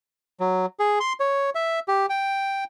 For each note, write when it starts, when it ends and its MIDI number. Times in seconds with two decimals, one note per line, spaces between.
0.40 0.66 54
0.79 0.99 68
1.00 1.13 84
1.20 1.50 73
1.55 1.80 76
1.88 2.06 67
2.09 2.64 79